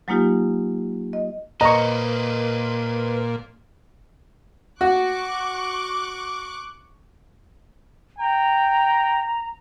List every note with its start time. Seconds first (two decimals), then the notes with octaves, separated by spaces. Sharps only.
0.08 F#3 G#3 A#3 D#4 F4 G4
1.13 D#5
1.61 A#2 B4 C5 D#5 A#5 C#6
4.81 F#4 C#6 D6 F#6
8.19 G5 A#5